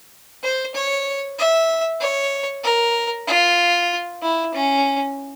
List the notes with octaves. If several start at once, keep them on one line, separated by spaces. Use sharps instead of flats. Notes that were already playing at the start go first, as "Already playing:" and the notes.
C5
C#5
E5
C#5
A#4
F4
E4
C#4